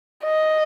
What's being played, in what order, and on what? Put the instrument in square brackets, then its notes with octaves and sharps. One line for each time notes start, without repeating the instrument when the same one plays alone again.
[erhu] D#5